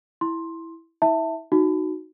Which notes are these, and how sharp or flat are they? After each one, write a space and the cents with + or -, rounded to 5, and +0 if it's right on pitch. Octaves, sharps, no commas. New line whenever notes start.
E4 +0 C6 +10
E4 -35 E5 -5 A5 +20
D#4 +0 F#4 +0